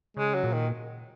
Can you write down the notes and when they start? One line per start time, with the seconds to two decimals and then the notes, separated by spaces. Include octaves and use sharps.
0.17 C#3 G#3
0.34 F#3
0.44 A#2
0.53 D#3